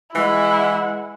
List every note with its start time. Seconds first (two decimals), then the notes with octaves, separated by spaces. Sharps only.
0.15 E3 G#3 E4 F#5